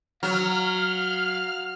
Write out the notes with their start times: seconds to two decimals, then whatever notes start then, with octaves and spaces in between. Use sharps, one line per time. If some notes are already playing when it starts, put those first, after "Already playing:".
0.23 F#3 F5 F6